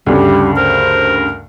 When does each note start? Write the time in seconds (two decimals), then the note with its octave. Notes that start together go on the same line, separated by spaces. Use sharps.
0.06 D2 G2 C#3 G3
0.56 A#4 C5